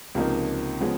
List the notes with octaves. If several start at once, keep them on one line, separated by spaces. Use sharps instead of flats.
C#2 C3 F3 A#3 D#4
C#3 F3 G#3 B3